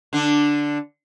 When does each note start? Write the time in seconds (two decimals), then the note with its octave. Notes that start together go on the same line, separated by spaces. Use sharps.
0.13 D3 D4